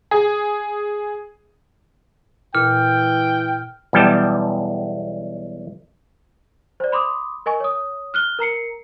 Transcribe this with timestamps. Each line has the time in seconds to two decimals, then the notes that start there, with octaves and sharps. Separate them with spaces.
0.11 G#4
2.55 A#2 E3 G5 F6
3.93 B1 E2 G3 G5 A5
6.80 C5 D5
6.92 B5 C6 D6 D#6
7.46 A#4 D#5 G#5 C#6
7.60 C#5 D#6
8.14 F6 F#6 G7
8.39 A#4 A#5 C7 C#7